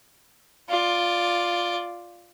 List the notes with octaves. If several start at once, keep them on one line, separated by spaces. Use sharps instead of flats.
F4 D5